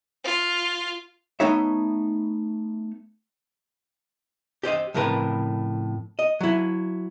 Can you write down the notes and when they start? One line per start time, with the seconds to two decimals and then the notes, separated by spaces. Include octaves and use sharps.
0.24 F4
1.40 A3 B3 D#4 C#5 E5
4.63 G4 C5 C#5 D#5
4.94 F2 A2 C#3 A#4 B4
6.19 D#5
6.41 F#3 E4